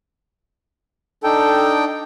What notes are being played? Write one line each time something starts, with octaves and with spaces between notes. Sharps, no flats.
D4 D#4 A4 G5